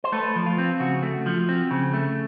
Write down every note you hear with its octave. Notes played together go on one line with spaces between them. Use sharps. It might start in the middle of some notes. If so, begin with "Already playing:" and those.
C5
A3 A4 B4
F3
F4
C4
C#3 F#4
A3
F3
C4
C#3
A3